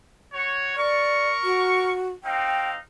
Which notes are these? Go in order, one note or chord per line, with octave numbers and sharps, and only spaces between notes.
F#4 C#5
A#4 D5 C#6
F#4
C4 D#4 F5 G5